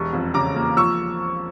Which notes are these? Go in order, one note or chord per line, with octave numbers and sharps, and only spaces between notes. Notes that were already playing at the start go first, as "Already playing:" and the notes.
Already playing: E1 G3 C#6
F2
C#3 A#5 D6
A#3
F3 C#6 E6